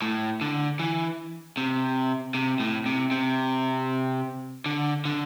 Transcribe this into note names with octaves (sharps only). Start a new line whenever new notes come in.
A2
D3
E3
C3
C3
A2
C3
C3
D3
D3